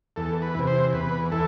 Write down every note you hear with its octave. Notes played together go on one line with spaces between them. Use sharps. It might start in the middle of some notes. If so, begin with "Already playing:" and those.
E2 A4
B4
C3 E3
C5
E2 B4
E3 A4